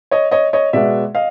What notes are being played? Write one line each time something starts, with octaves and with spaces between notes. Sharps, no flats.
C#5 D#5
C#5 D#5
C#5 D#5
B2 G#3 B3 D5 E5
D#5 F5